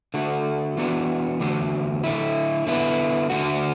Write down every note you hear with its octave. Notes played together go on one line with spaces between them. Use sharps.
D3 A3 F#4
E3 B3 D4 F#4
E2 D3 A3 D4 F#4
D3 A3 E4
D3 B3 E4
D3 A3 F#4